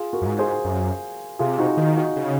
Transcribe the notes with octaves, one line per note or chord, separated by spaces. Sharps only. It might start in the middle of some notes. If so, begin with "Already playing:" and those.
Already playing: F4 G#4
F#4 A#4
F#2
G#2
G#4 C5
F#2
C3 F4 G#4
D#4 F#4
D#3 D#4 F#4
D#4 F#4
C#3